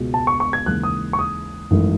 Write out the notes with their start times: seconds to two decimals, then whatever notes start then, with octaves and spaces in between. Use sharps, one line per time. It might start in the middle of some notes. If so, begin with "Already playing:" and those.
Already playing: C#2 B2 G#3
0.14 A5
0.27 C#6
0.40 C#6
0.53 G#6
0.66 D#2 C#3 E3 G#3 F#6
0.83 D#6
1.13 C#6
1.19 D#6
1.71 G#1 F#2 E3 A3